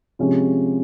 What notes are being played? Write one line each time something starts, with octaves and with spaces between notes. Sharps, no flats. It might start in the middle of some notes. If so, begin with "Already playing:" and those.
C3 F3 G#3 C#4